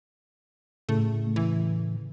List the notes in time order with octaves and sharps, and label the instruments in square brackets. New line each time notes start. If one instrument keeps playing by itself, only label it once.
[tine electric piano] A2 C#3 [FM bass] A3
[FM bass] E3